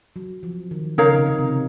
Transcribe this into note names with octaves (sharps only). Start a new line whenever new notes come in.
F#3
F3
D#3
C#3 D#4 A#4 C#5 F5
C3
C3